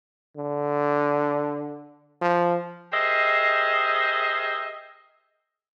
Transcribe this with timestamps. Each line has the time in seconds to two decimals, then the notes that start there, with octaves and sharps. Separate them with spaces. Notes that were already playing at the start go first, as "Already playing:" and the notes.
0.37 D3
2.22 F3
2.93 G4 G#4 A#4 C5 D#5 E5